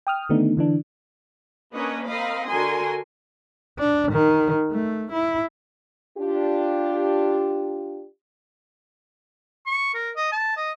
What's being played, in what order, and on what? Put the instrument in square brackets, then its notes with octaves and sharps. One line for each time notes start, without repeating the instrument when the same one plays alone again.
[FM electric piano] G5 D#6 F6
D3 D#3 A3 B3 D4 D#4
D3 E3 D4
[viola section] A#3 C#4 D4 B4 C#5 D#5
C4 A#4 D#5 F5 B5
D3 F#4 A#4 G#5 C6
[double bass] D4
D#3
A3
E4
[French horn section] D4 F4 G4
[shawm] C#6
A#4
D#5
A5
D#5